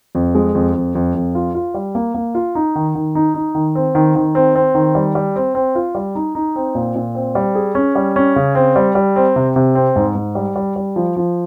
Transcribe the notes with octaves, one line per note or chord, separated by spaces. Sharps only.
F2
G#3
F2
F2
F2
F2
F4
F4
G3
A#3
A#3
F4
D#4
D#3
D#3
D#4
D#4
D#3
C4
D#3
D#3
C4
C4
D#3
G3
G3
C4
C4
F4
G3
D#4
D#4
C4
A#2
A#2
C4
G3
G#4
C#4
G3
C#4
C#3
C4
G3
G3
C4
C3
C3
C4
G#2
G#2
G3
G3
G3
F3
F3